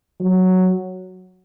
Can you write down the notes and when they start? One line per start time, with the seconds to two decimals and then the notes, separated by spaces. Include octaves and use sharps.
0.20 F#3